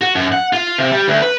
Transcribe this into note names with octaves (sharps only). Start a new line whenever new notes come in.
F#4
F#2
F#5
F4
C3
G3
D2
B4